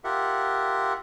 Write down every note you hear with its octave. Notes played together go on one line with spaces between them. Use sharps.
F4 G4 A#4 E5 F#5